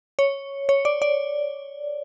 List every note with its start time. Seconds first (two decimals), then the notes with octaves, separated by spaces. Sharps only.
0.19 C#5
0.69 C#5
0.85 D5
1.02 D5